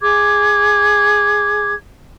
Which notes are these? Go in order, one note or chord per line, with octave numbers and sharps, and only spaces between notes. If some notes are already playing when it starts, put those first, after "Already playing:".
G#4 D6 G#6